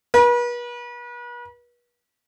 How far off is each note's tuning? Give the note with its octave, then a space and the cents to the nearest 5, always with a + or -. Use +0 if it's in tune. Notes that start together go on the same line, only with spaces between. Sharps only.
B4 -40